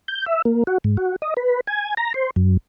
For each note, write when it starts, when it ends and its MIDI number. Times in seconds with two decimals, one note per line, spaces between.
0.08 0.25 91
0.26 0.42 76
0.45 0.63 58
0.67 0.78 66
0.84 0.97 44
0.97 1.16 66
1.22 1.34 75
1.37 1.60 71
1.67 1.94 80
1.97 2.13 82
2.14 2.30 72
2.36 2.57 42